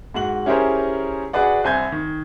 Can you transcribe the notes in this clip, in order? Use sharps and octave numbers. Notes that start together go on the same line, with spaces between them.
G#2 F#4 F#7
C#4 E4 G4 G#4 A#4 C5
D4 F#4 G#4 B4 D5 F#5
C2 C4 G#5 G6 G#6
D#3